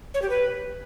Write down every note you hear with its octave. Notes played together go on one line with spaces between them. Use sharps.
C#5
G4
B4